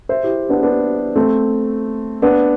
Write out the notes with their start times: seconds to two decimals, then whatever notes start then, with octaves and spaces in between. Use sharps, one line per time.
0.09 C5 E5
0.23 E4 G4
0.49 B3 D4
0.63 B3 D4
1.16 A3 C4
2.22 B3 D4